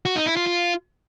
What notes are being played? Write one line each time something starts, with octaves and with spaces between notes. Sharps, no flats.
F#4
D#4
E4
F4
F4